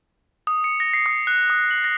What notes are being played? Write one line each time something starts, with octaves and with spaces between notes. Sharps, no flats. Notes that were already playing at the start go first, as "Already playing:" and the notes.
D#6
C#7
A#6
C7
D#6
F#6
D#6
F#7
A#6